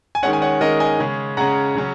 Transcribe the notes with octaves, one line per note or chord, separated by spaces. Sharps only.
G#5
D#3 G#3 C#4 C#5 F#5
G#5
C#5 F#5
D#3 G#3 C#4 A#4 D#5
D#5 G#5
C#3 G#3 C#4
C#3 G#3 C#4 F#5 A#5
C#3 F#3 C#4